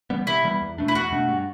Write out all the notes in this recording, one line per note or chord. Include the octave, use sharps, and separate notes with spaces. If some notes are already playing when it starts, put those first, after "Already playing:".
E3 G3 B3
C3 E4
E3 G3 B3
E2
B2 A3 D4
E4
E2 F#4
B2 A3 D4
G2